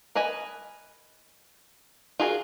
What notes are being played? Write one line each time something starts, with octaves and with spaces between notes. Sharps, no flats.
A#4 B4 D#5 G#5
F4 F#4 G#4 A#4